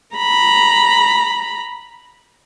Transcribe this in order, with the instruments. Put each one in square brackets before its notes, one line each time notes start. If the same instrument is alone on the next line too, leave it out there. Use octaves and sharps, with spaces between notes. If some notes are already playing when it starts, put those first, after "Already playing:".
[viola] A#5 B5